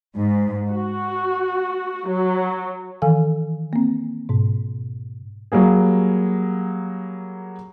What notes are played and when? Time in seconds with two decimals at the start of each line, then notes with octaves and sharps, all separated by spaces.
0.17 G#2
0.71 F#4
2.08 F#3
3.02 D#3 E3 A4 F5 G#5
3.73 A#3 C4
4.29 G#2 B2
5.52 F#3 G3 A#3 G#4